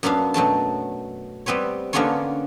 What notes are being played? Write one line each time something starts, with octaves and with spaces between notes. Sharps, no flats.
F#2 A#3 B3 D4 F5
B2 F#3 A3 A5
G3 B3 C4 B4 C#5
D3 A#3 B3 C#4 F4 C#5